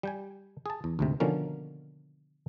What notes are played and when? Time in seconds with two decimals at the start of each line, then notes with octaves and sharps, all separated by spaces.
0.03 G3 G5 G#5
0.66 G#4 A5
0.84 E2
0.99 D2 G#2 C3
1.20 B2 D3 D#3 F3 A#3 C#4